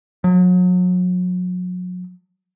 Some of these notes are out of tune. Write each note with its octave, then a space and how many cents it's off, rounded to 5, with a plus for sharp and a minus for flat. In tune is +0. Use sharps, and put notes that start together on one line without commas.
F#3 -35